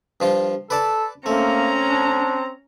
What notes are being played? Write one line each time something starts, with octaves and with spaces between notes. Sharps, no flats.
G2 F3 F4
A4 B4 D5 A5
A3 A#3 C4 C#4 A#5
D4